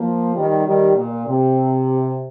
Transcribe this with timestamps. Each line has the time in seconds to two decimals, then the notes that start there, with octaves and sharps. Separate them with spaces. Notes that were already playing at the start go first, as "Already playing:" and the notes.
Already playing: F3 A#3
0.35 D#3 G3
0.66 D#3 G3
0.96 A#2
1.27 C3